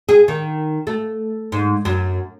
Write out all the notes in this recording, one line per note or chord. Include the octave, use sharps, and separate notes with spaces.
G#4
D#3
A3
G#2
F#2